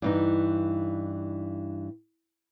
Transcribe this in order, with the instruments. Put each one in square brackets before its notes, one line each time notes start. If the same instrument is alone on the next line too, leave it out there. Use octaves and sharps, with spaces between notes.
[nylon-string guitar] G2 E3 D#4